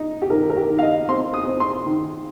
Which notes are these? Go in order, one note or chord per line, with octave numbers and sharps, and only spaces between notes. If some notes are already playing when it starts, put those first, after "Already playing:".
Already playing: D#4
G4
D#3 A#4
A#4
G4
D#3
F5
D#5
C4 C6
D#6
C4
C6
D#3